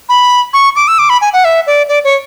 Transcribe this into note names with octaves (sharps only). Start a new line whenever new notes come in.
B5
C#6
D6
E6
D6
B5
G#5
F#5
E5
D5
D5
C#5